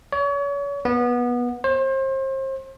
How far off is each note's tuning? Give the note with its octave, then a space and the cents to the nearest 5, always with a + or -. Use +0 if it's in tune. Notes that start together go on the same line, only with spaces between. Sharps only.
C#5 +35
B3 -20
C5 +35